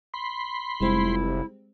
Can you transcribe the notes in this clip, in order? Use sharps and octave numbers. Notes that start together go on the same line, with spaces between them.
B5 C6
F1 G3 G#3 C4 E4